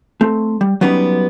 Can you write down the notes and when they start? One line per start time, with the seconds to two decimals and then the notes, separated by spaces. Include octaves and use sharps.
0.21 A3 C4
0.61 G3
0.81 F#3 G3 B3 C#4 D#4